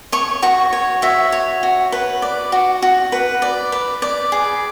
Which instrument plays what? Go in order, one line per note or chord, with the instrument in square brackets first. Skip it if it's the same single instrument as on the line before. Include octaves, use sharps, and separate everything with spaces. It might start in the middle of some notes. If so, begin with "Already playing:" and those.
[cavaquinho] C#5 C#6
F#4 C#6
C#5
F#4 E5
C#5
F#4
B4
D5
F#4
F#4
B4
D5
B4
D5
G#4